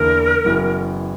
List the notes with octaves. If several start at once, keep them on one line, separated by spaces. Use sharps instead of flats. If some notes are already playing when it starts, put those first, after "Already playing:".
Already playing: E2 D3 A#3 E4 A#4
F#1 F#2 E3 B3 F#4